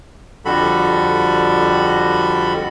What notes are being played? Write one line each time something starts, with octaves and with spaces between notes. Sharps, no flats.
F2 D3 G3 F#4 A4 B5